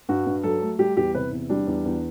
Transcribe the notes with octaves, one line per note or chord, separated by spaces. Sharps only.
G2 F#4
G2
F#3 A4
A3
G3 G4
E2 G4
C3 B4
E2
G3 D4
E2
E2